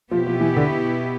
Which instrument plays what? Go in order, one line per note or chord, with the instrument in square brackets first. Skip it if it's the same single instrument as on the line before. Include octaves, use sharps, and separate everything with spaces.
[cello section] B2 B3 E4 G4 [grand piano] F3
[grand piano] F3
E3
D3